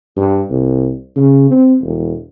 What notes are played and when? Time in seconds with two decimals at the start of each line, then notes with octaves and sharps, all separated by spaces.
0.17 G2
0.50 C2
1.16 C#3
1.50 C4
1.81 E1